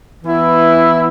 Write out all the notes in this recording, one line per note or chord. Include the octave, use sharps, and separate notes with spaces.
E3 B3 E4